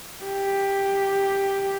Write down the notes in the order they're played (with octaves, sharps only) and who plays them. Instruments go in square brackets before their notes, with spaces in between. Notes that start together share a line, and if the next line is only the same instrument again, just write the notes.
[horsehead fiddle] G4